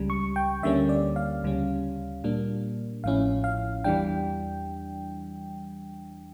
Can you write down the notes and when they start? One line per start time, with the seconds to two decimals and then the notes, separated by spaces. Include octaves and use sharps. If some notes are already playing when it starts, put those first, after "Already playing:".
Already playing: C#2 C#3 G3
0.10 C#6
0.36 G5
0.63 D2 D3 G3 A#3 C#4 E5
0.89 D5
1.16 F5
1.44 D2 C#3 G3 C#4
2.24 A#2 G3 A#3 D4
3.04 A1 A2 F3 C#4 E4 F5
3.44 F5
3.84 E2 E3 G3 D4 G5